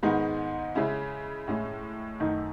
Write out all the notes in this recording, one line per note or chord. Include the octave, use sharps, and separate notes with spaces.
G#2 D#3 G#3 B3 D#4
C#3 G#3 C#4 E4
A2 G#3 C#4 E4
F#2 D#3 A3 D#4